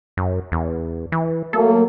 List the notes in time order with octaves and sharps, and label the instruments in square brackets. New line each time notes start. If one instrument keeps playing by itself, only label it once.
[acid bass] F#2
E2
E3
[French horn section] F#3 A3 A#3 [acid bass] A4